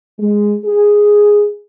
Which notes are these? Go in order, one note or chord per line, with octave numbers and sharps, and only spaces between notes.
G#3
G#4